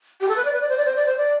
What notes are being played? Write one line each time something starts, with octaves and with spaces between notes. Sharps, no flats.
G4
A4
B4
D5
B4
D5
C5
D5
C5
D5
C5
D5